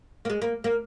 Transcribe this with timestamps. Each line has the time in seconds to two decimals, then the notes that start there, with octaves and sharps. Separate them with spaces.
0.25 A#3
0.30 G#3
0.42 A#3
0.64 A#3